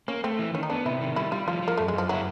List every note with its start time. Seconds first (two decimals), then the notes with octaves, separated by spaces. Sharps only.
0.08 A#3 C#4
0.24 A3 C4
0.39 E3
0.54 D#3 C#4
0.63 D#4
0.70 B3 D4
0.86 C3 E4
1.01 D#3
1.16 G3 E4
1.32 G3 F4
1.47 F3 F4
1.62 F3
1.68 A#3
1.78 F#2 A3
1.88 G#3
1.93 F#2 F3
2.09 F#3 E4